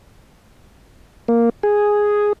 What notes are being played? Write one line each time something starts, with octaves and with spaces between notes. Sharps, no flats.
A#3
G#4